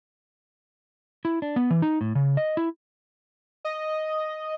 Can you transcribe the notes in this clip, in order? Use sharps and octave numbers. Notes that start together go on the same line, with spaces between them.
E4
D4
B3
E3
D#4
A2
C#3
D#5
E4
D#5